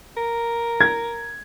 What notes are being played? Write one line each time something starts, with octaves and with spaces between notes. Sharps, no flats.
A#4
G#6